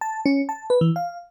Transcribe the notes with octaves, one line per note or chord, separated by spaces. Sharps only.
A5
C#4
A5
B4
E3
F5